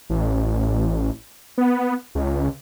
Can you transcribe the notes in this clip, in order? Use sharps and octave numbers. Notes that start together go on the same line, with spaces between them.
A1
B3
C#2